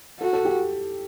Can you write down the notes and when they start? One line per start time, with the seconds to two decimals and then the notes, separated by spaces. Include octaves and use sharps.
0.21 F#4 A4
0.33 A4
0.45 G4